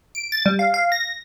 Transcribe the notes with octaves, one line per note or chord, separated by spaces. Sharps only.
D7
A6
G3
F5
F5
A#6